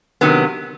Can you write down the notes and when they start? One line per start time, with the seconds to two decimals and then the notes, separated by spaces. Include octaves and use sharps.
0.21 C3 D#3 F#3 B3